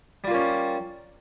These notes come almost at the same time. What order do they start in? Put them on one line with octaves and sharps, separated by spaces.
G3 F4 A#3 C#4